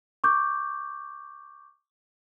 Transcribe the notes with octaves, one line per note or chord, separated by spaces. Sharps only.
C#6 D6 G6